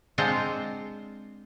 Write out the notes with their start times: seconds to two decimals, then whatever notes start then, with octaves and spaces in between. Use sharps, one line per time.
0.18 G#3 C4 D4 F4 C5 F#5